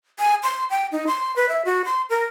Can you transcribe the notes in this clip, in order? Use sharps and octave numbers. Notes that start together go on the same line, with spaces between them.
G#5
C6
G5
D#4
C6
B4
E5
F#4
C6
A#4